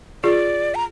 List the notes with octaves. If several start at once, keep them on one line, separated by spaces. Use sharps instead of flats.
F4 G#4 D5
A#5